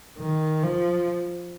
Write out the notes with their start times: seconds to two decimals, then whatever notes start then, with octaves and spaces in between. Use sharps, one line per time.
0.18 D#3
0.63 F3